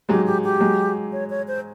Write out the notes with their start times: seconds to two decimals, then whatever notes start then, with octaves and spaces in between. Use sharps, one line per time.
0.09 F#3 G#3 G4
0.26 G4
0.44 G4
0.60 F#3 G#3
1.12 C#5
1.30 C#5
1.48 C5